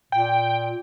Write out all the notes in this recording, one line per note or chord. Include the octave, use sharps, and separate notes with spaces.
A#2 G5